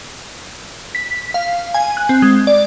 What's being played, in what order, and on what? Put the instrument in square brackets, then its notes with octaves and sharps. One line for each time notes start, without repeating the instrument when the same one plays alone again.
[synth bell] B6
F5
G#5
F#6
C4
G#3
D5